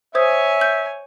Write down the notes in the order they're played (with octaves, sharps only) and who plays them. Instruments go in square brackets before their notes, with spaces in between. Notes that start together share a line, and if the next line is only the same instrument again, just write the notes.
[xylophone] C5 D#6 G#6 [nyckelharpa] C#5 G#5 [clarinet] E5
[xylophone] G6